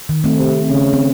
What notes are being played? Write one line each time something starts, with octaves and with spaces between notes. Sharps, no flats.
D#3
A3 C4
C3
C#3
C4